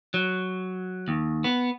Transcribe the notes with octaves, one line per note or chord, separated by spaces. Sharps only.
F#3
D#2
B3